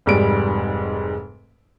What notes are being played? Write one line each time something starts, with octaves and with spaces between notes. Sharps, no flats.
F1 G#2 G3 D7